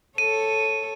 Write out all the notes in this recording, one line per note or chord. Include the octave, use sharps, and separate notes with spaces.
A4 C#5 D#7